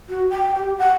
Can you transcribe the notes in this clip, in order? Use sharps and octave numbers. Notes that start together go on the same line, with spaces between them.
F#4
G5
G4
F#5